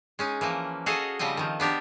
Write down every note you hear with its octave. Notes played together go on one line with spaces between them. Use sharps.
G#3 C#4 D#4
E3 F3 A#3
F#4 G#4 A4 D#5 F5
C#3 F3 G3 C4 D#5
D#3 F3
B3 D4 G4 A#4